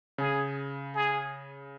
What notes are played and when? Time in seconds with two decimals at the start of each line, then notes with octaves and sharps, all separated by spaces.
0.18 C#3 G#4
0.95 G#4